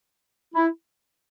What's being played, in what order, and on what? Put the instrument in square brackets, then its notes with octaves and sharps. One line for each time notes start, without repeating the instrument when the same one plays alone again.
[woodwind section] E4